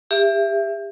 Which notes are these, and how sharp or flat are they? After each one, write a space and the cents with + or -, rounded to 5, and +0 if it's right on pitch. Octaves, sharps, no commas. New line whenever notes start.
G4 +30 E5 +20